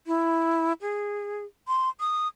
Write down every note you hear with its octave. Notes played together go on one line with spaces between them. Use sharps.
E4
G#4
C6
D#6